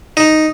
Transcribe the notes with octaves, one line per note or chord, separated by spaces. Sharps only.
D#4